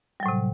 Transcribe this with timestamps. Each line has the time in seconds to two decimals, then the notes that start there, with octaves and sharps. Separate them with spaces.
0.20 G3
0.23 F#3
0.26 A2
0.28 C3